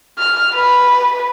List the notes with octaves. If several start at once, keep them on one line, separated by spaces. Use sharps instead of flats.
F6
B4